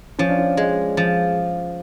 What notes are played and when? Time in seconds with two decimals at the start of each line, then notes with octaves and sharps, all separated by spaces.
0.19 F3 C#4
0.29 D4
0.38 C#4
0.57 G#3
0.97 F3